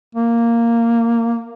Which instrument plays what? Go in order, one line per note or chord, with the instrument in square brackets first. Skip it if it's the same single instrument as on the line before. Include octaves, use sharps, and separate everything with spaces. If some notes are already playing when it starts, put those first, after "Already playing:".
[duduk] A#3